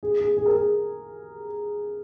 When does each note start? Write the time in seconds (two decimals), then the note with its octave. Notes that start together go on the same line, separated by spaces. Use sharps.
0.03 G#4
0.20 G#4
0.37 G#4
0.46 A#4
0.55 G#4